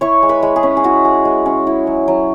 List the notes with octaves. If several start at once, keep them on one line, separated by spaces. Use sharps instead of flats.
E4 C#5 C#6
G#3
B4 B5
G#3
G#4
C#4
G#4
E4 F#4
G#3
G#3
C#4
E4
F#3
F#3